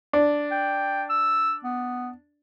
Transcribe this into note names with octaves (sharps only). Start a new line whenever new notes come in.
D4
G5
E6
B3